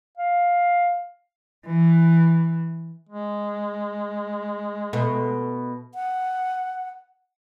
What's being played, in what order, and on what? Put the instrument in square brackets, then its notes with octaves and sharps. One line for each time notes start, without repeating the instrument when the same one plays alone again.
[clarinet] F5
[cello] E3
[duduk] G#3
[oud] B2 A3
[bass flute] F#5